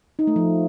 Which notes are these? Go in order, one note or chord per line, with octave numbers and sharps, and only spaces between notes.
D#4
A3
F3